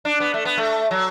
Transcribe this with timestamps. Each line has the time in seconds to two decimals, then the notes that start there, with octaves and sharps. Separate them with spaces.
0.05 D4
0.20 B3
0.34 A3
0.45 B3
0.57 A3
0.91 F#3